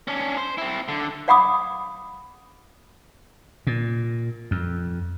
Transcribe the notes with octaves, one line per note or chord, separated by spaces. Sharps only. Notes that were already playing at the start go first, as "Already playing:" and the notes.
C#4 D4
C5
C4 E4
D3
D5 F5 F#5 B5 D6 D#6
A#2
F2